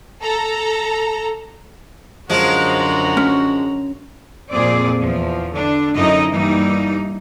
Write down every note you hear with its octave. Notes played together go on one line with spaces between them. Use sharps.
A4 A#5
F#2 D3 F3 G#3 F#4 A#5
C#4
F2 A#2 C4 G#4 D5
E2 F3
D3 D4
F#2 D3 C#4 D#4 E4 D#5
G2 E3 G3 A#3 D#4